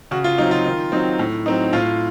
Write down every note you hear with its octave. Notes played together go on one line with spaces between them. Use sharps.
C#3 F#4
F4
F#3 C4 D#4
F4
D#3
F#3 C4 D#4
A2
F#3 C4 D#4
A2 F4